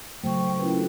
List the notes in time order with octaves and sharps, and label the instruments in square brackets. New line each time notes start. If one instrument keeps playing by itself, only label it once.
[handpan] C#3 F#3 A3 [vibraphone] C5 C#6 [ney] G5
[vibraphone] C#4 E4 A#4 [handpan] F4 B4
[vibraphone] D4 F#4 A4